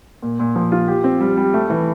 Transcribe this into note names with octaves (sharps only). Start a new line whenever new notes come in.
A#2
A#2
F3
F4
G4
C4
G3
G3
A3
E3